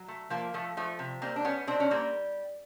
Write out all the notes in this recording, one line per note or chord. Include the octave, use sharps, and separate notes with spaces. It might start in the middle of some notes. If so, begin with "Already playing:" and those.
Already playing: F#3
A3
F3 A#3
F3 A3
F3 A3
C3
G3 A#3 C4
D4
G3 B3 C#4
B2 C4 D4
C#4
G3 A#3 C4